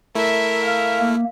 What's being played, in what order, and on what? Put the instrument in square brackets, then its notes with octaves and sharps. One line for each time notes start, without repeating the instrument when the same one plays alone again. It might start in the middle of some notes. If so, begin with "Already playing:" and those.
[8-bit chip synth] A3 E4 [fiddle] A#4 E5
[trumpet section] F5
[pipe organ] A#3